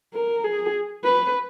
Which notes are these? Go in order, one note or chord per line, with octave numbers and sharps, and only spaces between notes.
A#4
G#4
B4